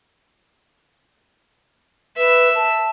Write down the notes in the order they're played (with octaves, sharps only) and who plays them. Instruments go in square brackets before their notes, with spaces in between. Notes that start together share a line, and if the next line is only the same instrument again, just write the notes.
[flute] B4 [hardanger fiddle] E5
[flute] A5